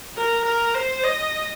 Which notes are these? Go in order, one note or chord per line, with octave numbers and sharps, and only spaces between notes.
A#4
A#4
C5
D#5